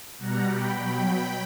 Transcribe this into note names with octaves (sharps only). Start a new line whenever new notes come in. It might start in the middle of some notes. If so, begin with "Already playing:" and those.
B2 G3 F#5 A#5
G5 B5
B2 F#3